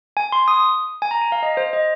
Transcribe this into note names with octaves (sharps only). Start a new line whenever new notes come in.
G#5
C6
D#6
G#5
A#5
G#5
F5
D#5
C5
D#5